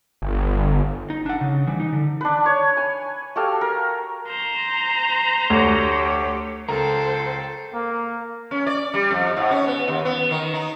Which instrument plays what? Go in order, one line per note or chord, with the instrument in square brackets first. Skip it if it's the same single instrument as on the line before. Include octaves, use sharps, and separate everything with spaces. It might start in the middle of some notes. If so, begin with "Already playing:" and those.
[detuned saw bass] G1
[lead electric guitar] D#4
D4 F#5
C#3
E3 G3
D#4
D3
[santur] D4 B4
C#5
G#5
F#4 G4 A4 F5
A#4
[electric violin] C5 A#5
[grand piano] D2 [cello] G4 C#5
[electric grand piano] C#2 A#4 A#5 [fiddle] A4 [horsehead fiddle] C5 G5
[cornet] A#3
[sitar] C#4
D5
G3
F2
G#2
C#4
B3
D#2
B3
D#3
D#4